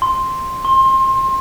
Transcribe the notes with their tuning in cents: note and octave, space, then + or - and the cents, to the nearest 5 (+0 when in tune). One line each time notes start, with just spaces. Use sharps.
C6 +5
C6 +25